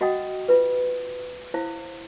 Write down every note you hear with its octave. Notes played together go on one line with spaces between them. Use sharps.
F#4 D#5 F#5 G5 D#6
F4 B4
E4 C5 F5